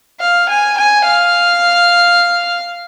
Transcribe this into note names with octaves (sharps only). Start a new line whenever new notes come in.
F5
G#5
G#5
F5